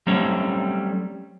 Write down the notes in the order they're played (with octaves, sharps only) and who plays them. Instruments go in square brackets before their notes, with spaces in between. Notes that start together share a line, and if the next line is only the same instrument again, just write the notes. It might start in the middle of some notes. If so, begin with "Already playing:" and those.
[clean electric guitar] F#3 G3 A3 C4 C#4 C#5